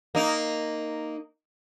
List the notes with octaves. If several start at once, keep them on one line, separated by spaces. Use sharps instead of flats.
A#3 D#4